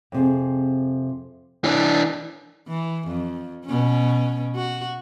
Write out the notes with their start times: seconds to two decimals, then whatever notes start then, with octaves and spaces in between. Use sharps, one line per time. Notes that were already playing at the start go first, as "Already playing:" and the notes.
0.12 F2 C3 G#4
1.64 E3 D4 C#5
2.68 E3
3.07 F2
3.65 B2 C#4
4.55 F#4